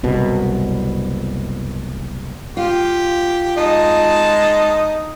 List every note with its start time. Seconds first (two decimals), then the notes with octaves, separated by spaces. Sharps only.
0.03 F#1 C2 B2
2.57 F4 G4
3.57 G#3 D#4 A5